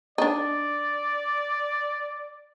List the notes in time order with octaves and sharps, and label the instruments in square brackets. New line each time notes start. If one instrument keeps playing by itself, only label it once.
[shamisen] D4 D#4 [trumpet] D5